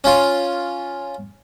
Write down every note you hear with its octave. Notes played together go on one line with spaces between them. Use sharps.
C#4 F4